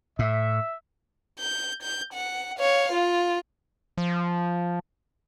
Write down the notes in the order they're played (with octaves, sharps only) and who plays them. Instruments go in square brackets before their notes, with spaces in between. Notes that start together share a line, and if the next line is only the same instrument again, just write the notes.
[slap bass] A2 [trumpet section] E5
[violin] G6
G6
F#5
C#5 F5
F4
[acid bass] F3